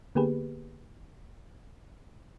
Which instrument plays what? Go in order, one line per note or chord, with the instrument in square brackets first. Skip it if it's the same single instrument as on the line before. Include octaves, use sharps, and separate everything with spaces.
[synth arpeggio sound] D3 A#3 B3 G4 G#4 B4